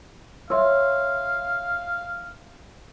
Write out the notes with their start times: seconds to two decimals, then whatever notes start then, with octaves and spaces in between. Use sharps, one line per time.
0.50 C#5 E5 F5 C6 E6